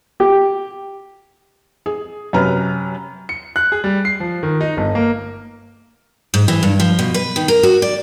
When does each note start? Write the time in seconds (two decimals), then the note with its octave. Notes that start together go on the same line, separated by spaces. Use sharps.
0.20 G4
1.86 G#4
2.33 F#2 C3 C#4 B4 A#5 F6
3.29 C#7
3.56 F#6
3.72 G#4
3.84 G3
4.05 C7
4.20 F3
4.43 D#3
4.61 D#4
4.77 G1
4.95 A#3
6.34 G#2
6.48 E3
6.63 G2
6.80 F3
6.99 B2
7.14 B4
7.36 D#3
7.48 A#4
7.63 F#4
7.82 D5